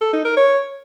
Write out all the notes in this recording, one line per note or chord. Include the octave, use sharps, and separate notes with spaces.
A4
D#4
A#4
C#5